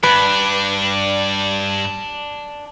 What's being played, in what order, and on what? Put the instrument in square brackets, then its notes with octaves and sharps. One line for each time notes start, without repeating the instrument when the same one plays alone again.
[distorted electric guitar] G2 [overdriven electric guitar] D4 [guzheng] B4